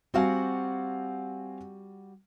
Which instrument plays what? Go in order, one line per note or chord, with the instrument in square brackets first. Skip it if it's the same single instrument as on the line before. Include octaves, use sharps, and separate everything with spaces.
[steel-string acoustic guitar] G3 F#4 F#5 [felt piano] C4 F5 G#5